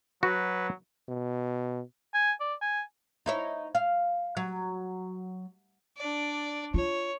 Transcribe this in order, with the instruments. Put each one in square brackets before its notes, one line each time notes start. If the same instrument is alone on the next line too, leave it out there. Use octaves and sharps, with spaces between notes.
[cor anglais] F#3 [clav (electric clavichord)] F#4 [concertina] B4
[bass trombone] B2
[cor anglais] G#5
D5
G#5
[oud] D#4 E4 C#5
F5
F#3
[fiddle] D4 D5
[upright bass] F4 [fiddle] C#5